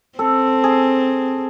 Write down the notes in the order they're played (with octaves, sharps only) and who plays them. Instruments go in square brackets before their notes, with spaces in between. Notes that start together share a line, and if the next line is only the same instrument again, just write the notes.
[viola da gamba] C4 [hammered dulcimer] A4
[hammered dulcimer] G#4